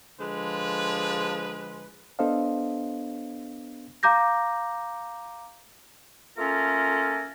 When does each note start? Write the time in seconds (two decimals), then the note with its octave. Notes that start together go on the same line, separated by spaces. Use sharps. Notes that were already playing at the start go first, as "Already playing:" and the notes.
0.19 D3 F3 G#3 B4
2.19 B3 D4 A4 C5 D#5 F5
4.03 F5 A#5 D6 G6 A#6
6.38 A3 A#3 C#4 F4 A4 A#4